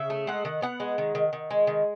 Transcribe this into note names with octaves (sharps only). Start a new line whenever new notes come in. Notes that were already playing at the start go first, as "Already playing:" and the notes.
Already playing: C#3 E5
A3
G#3 F#5
D#3
B3 F#5
G#3
D#3
D#3
D#3
G#3
D#3